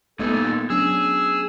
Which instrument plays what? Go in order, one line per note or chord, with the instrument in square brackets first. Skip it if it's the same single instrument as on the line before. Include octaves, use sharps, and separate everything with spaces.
[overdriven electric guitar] A#2 D#4 [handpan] A3 B3 D#5 [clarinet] A4
[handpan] F#3 C#4 D4 [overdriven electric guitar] G#4 [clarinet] E6